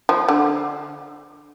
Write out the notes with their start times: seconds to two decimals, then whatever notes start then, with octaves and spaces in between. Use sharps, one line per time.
0.09 F3
0.29 D3